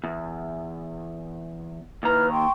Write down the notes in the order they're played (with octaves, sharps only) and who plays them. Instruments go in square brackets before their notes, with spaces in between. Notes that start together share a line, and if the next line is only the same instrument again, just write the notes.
[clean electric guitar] E2
[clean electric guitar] D#2 A#5 [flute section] E4 B4 F6
[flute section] G5 C6 C#6